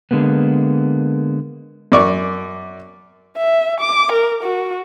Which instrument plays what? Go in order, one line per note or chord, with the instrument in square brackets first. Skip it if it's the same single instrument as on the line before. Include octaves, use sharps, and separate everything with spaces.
[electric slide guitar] D3 G#3 A#3 B3
[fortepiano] F#2 D5 C#6
[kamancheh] E5
D6
A#4
F#4